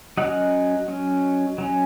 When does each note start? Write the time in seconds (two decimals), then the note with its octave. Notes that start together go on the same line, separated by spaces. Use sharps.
0.17 F#3 C#4 D#5 F#5
0.88 F#3 C#4
1.58 F#3 C#4